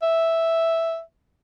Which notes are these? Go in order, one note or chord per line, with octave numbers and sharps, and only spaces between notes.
E5